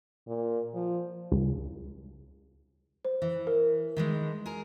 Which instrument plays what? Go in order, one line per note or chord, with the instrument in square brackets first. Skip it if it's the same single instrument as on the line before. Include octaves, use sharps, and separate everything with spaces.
[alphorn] A#2
F3
[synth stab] C#2
[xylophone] C5
[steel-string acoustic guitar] E3
[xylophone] A#4
[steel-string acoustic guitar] D#3 E3 G#3
G#4 A#4